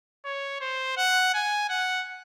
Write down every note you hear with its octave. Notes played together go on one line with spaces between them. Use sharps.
C#5
C5
F#5
G#5
F#5